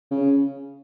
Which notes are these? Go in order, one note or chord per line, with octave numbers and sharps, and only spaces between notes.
C#3